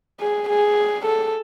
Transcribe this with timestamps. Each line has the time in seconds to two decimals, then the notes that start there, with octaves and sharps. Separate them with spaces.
0.20 G#4
0.49 G#4
1.06 A4